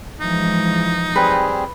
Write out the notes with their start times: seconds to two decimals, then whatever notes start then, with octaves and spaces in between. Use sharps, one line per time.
0.21 E3 F3 G#3 D#4
1.16 G3 C4 G#4 B4